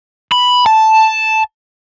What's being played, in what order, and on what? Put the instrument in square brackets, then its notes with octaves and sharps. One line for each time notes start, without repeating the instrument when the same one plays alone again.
[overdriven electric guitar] B5
A5